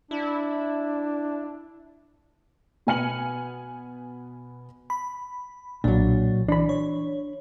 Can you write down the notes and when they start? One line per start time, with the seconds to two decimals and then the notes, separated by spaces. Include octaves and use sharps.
0.11 D4 E4
2.87 B2 B3 G#5 F6 C#7 F#7
4.90 B5
5.84 B1 A#2 F#3 D4
6.48 E3 D4 B5
6.69 C#5